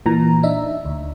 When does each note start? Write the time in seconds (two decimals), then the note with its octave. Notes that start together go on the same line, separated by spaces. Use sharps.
0.06 A#2 E3 A#5
0.43 D4 D#4 E5
0.85 D2